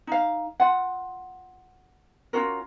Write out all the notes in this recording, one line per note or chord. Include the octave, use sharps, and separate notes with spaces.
D#4 F5
F4 F#5
C#4 F4 F#4 A#4